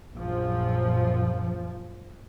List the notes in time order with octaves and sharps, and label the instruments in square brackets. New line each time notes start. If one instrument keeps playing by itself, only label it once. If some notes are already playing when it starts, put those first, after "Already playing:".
[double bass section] A#1 F#2 F3